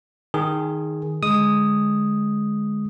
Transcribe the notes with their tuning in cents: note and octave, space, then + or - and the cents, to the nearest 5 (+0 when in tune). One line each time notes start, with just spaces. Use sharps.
D#3 +0 G#4 +0
D3 +0 G#3 +0 D#6 +0